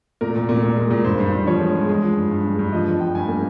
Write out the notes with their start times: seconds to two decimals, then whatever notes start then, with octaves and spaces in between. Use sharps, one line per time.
0.21 A#2 A#4
0.36 A#2
0.49 A#2
0.63 A#2
0.77 G#3
0.91 A#2
1.05 G2 C5
1.20 G2
1.32 G2
1.47 F3 C#5
1.61 G#3
1.75 G#3
1.89 G#3
2.03 F3
2.17 G2
2.31 G2
2.44 G#3
2.59 G2
2.73 F3 D#5
2.87 F3
3.00 F3 G5
3.15 G2 G#5
3.28 A#3